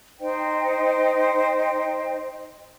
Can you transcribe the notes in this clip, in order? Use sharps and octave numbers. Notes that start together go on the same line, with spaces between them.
D#4 C5 D#5 G5